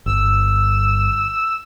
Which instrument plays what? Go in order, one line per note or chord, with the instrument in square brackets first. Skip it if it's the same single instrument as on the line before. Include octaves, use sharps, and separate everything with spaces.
[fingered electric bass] G1 [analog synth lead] E6